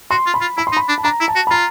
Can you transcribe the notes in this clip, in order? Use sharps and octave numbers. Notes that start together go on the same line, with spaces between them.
F#4 C6
F4
B5
F4
E4 B5
C6
D#4
B5
D4
A5
D4 A#5
E4
A5
F#4
B5
F4 A#5